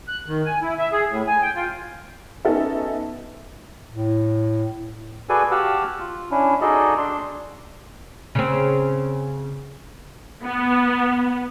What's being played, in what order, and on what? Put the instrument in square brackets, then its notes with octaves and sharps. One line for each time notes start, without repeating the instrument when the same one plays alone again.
[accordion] F#6
D#3
G#5
E4
E5
G#4
A2
G#5
G5
F4
[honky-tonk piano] B3 C#4 D#4 F#4 A4 E5
[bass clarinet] A2
[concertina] F#4 G#4 A4 B4 D5 G#5
F#4 G4 F5 F#5 A5 E6
F4
C#4 D4 E4
D#4 F#4 G#4 A4 D5 D#5
D4 C6
[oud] C#3 C4
[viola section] B3